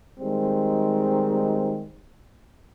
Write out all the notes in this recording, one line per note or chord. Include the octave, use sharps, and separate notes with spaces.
D#3 G3 G#3 C4